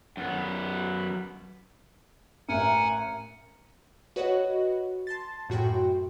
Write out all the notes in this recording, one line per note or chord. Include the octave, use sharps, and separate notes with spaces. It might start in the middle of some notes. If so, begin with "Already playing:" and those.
F#2 B3
A1 A#4 E5 F#5 G#5
F#4 B4 C#5 D#5 F#5
A5 C6 A6
F#2 A2 F#4 G5 C6